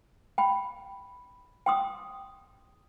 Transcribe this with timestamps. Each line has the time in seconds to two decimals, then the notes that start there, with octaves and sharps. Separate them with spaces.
0.38 G5 B5
1.66 G5 C6 D#6